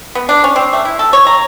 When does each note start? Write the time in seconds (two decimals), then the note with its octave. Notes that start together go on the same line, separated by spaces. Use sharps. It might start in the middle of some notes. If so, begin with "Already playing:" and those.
0.15 B3
0.29 D4
0.44 C#4
0.56 C4
0.73 A3
0.85 E4
0.99 A4
1.13 C#5
1.27 A#5